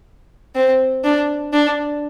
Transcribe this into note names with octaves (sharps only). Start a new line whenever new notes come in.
C4
D4
D4